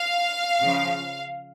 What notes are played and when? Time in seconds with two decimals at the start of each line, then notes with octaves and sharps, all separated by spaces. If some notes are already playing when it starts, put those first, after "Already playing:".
Already playing: F5
0.62 C#3 F3